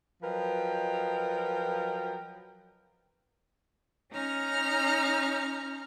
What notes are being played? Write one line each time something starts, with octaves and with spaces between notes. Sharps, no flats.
F3 F#3 A#4 B4 D#5 G5
C#4 D#4 A#5 F6